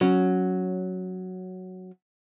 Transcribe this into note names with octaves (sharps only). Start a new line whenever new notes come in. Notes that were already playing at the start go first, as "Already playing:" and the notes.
F#3 C#4